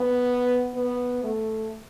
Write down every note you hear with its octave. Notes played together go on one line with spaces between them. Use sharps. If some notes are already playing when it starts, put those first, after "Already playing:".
Already playing: B3
B3
A3